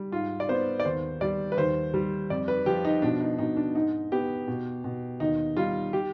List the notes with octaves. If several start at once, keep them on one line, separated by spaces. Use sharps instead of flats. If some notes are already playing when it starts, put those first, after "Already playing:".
Already playing: G3
G#2 F4
D5
B3 C5
D5
D#2 C5
G3 D5
B4
D#2 C5
G3
F2 D5
B4
F3 G4
D#4
B2 D4
D#4
B2 D#4
D4
G#2 D#4
B3 G4
B2
B2
D#2 D#4
G3 F4
G4